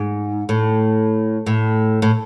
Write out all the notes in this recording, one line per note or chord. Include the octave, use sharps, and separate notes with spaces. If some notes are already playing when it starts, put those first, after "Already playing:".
Already playing: G#2
A2
A2
A2